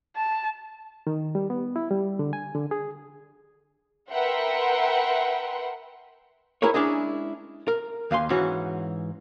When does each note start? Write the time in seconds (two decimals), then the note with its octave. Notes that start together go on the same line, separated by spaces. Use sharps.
0.16 A5
1.07 D#3
1.35 G3
1.50 B3
1.76 E4
1.91 G3
2.19 D3
2.33 G#5
2.55 D3
2.71 G#4
4.11 A#4 B4 E5 F#5 G5 C6
6.62 E4 G#4 A#4 B4 C#5
6.74 G#3 C#4 D4 E4 G#4 D#5
7.68 A#4
8.11 D#2 F5 G#5 C6
8.30 G#2 E3 C#4 F#4